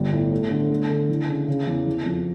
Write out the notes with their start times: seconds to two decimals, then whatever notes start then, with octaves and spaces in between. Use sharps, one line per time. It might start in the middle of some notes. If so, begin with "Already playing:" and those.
Already playing: G1 G3
0.12 A2
0.31 A3
0.51 D3
0.70 A3
0.89 D3
1.09 E3
1.28 C#3
1.48 C#3
1.67 E2
1.86 E3
2.06 F2